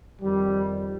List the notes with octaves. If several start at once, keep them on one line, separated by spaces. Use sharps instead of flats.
F2 D#3 G3
G3